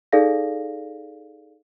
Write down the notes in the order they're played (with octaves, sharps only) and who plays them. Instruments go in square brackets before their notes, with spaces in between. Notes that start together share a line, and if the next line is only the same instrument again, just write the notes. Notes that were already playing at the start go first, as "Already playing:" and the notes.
[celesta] D#4 G#4 A4 D5 F5 A#6